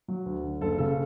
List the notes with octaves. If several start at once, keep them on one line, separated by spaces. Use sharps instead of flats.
F#3
D2
D3
F#1 A4
C#3 A4